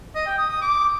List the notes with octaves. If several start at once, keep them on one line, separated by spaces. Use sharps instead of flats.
D#5
G5
D#6
D#6
D6